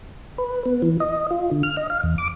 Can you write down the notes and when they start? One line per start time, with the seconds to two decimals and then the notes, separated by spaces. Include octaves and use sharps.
0.38 B4
0.66 B3
0.82 E3
1.00 D#5
1.31 F4
1.51 D3
1.63 F6
1.77 D#5
1.90 F5
2.03 E2
2.18 D6